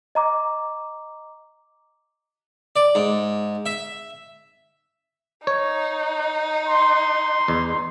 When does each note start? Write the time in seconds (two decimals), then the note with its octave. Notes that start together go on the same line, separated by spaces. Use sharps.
0.15 D#5 A#5 D6
2.76 D5
2.95 G#2
3.66 E5
5.47 D#4 C#5
6.67 C6
7.48 E2